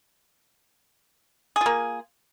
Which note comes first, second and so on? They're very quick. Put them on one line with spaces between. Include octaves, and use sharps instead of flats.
G#4 F4 A#3